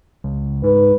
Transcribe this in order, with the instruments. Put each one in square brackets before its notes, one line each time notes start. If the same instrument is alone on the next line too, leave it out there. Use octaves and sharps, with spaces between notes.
[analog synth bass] C#2
[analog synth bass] G#2 [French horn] B4